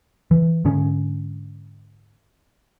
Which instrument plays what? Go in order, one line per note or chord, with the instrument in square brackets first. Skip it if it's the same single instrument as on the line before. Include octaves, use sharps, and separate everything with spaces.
[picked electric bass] E3
G#2 D3 C#4